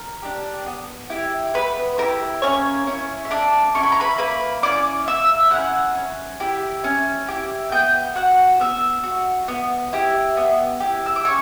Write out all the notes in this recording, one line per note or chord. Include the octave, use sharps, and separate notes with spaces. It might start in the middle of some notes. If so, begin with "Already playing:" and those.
Already playing: A#4
D4 G4
B3
E4 G4
B3 B4
E4 G4 A#4
A#3 C#4 C#5
C#4 E4
E5
A#3 D4 D5
C#4 E4 C#6
B5
A#5
B4 B5
A#3 B4 B5
C#4 E4 D5 D6
A#3 E5 E6
C#4 E4 F#5 F#6
C#4
E4 G4
C#4
E4 G4
B3 G5 G6
F#4 F#5 F#6
B3 E5 E6
F#4
B3
E4 G4
B3
E4 G4
E6
D6
C#4 C#5 C#6